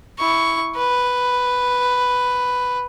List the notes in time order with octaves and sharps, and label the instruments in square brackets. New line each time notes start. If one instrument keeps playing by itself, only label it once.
[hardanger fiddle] E4 C#6
B4